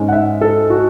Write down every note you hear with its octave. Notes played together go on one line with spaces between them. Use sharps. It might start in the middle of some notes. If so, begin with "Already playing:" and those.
Already playing: G#2 G#3 C#4
F#5
E5
A4
F#4